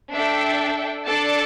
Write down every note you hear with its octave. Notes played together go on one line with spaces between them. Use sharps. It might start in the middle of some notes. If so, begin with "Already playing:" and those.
D4 A4 E5 G5
D4 A4 D5 A5